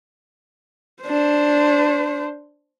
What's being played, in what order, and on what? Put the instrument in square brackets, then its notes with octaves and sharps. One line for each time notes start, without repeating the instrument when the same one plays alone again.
[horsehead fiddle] D4 C5